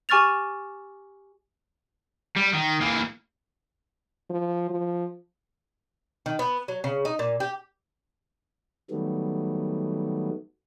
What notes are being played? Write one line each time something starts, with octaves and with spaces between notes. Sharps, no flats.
G4 G#5 C#6 F6 A6 F7
G3
D#3
E3 A#3
F3
F3
D#3
B3
F#3
C#3
D#4
A#2
G4
D#3 F#3 G3 A3 B3